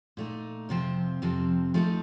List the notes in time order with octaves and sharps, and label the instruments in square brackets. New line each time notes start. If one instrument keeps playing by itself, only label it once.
[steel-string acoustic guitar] A#2 A3 D#4
F2 C3 F3 C4
F2 C3 F3 C4
F3 A3 D#4 A4